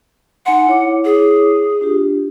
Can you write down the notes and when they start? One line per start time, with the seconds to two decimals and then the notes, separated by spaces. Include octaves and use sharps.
0.46 D#4 F#5 G#5 C6
0.67 E4 C#5 D6
1.05 G#4
1.81 D4 F4 G4